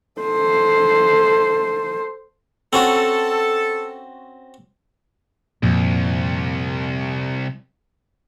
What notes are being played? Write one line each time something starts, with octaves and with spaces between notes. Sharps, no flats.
A4 C5
C4 C#4 F#4 A4
C2 F2 A#2